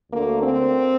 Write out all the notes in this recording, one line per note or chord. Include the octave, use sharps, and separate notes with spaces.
D2 D3 A3 A#3
C4